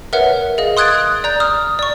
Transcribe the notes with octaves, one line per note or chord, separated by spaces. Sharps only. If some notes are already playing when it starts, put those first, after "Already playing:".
A#4 B4 C#5 E5 F#5
G#4 D#5 F5
C6 D#6 F#6 G#6 A6 D7
D5 A#5 G6
D#6 F6
D5 C#6